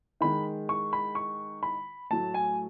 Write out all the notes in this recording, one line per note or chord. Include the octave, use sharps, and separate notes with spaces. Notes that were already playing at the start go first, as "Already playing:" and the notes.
D#3 G#3 B5
C#6
B5
C#6
B5
A2 F#3 A3 A5
G#5